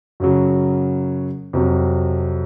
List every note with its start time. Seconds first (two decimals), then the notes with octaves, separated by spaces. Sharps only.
0.20 F#2 C#3 F#3
1.53 F2 C3 F#3